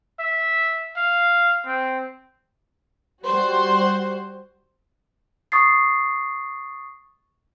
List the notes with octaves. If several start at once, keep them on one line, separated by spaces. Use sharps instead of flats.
E5
F5
C4
G3 F#4 C5
C#6 D#6 A6 C7